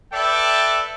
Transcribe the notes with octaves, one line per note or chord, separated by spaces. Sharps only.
A4 B4 D5 E5 G5